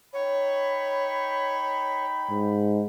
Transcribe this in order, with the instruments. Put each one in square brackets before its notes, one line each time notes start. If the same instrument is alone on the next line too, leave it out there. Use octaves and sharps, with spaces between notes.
[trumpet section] D#4 G5 B5 [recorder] C#5
[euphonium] G#2